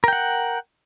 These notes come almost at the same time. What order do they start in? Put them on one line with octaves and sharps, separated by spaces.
A#4 G5 F#5